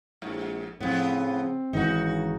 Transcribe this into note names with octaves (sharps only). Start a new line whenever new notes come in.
A#1 G#2
A2 C#3 F3 B3 C4
G#1 C#3 E3 D#4 F#4